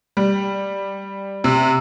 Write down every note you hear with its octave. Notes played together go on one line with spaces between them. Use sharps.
G3
C3